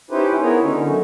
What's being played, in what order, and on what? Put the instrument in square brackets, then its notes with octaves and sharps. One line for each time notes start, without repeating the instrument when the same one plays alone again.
[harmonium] C#4 D#4 E4 G4 B4 C5
B3 E4 F#4 G#4 A#4 C#5
D3 C#4 D#4
F#3 A3 F#4